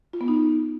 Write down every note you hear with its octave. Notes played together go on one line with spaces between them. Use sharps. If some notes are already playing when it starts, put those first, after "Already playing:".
F4
B3
D#4